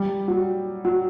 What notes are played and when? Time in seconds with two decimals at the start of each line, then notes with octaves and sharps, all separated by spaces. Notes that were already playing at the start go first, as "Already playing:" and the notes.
Already playing: G3
0.28 F#3
0.85 F#3